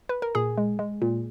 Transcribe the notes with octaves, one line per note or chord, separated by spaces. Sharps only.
B4
A#4
A#2 G#4
G#3
G#3
A#2